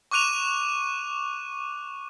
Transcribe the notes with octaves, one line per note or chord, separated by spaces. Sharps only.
C#6 D6 F#6 D#7 F7